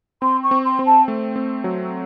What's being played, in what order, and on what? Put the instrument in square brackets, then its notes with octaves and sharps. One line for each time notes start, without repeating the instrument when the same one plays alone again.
[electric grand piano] C4 [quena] C6
[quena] C#6
[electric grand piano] C4
[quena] C6
[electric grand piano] C4
[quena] A5
[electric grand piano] A3
C4
F#3